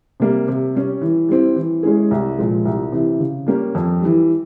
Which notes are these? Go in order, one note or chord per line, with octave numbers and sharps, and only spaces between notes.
C3 G3 A#3
C3
G3 C#4
E3
G3 C4 E4
E3
G#3 C#4 E4 G#4
C2
A#2 F3 G#3
C2
C3 E3
C#3
G3 A#3 C#4 G4
F2
E3 G3